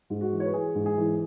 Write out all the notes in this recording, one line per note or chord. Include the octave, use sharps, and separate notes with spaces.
G#2
F#4
E3
C#5
B4
E3 G#4
G#2
G#4
E3